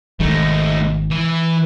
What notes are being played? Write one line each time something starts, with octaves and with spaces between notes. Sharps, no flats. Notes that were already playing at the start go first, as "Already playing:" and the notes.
G#1 D#3 G#3 A3 D#4
E3